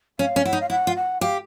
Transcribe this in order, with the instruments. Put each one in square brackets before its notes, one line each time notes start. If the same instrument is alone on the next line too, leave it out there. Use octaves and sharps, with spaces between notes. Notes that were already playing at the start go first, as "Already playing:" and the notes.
[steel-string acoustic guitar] C#4 [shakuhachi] F5
[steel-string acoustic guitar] C#4
[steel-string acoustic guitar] E4 [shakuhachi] F#5
[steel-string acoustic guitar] D#4
[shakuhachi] F5
[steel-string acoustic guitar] E4 [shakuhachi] F#5
[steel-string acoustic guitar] F4
[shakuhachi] F#5
[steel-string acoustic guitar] G4 [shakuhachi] F5